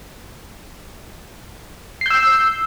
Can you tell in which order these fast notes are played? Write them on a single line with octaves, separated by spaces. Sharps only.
C7 G6 E6